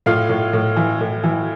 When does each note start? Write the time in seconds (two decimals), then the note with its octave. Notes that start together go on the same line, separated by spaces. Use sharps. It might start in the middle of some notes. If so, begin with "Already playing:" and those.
0.06 A2 F4 F5
0.29 A2
0.53 A2
0.76 E3
1.00 A2
1.24 E3